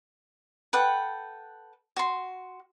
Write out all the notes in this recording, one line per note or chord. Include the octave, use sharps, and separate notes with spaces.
A4 B4 F#5 G5
F#4 C6